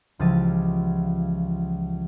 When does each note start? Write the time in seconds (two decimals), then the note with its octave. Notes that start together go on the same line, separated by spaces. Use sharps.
0.19 C#2 E3 F3 G4 A6 D#7